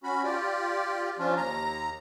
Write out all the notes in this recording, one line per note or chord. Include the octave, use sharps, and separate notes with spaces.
C#4 F#4 B5
F4 G4 D5
F3 C#4 D4 F4
D#2 A#5